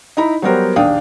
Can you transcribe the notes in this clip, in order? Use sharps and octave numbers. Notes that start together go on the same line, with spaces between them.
D#4 E4 A#5 B5
F#3 G3 B3 G4 A#4 C5
A#1 D#2 D4 F5 G5 D#6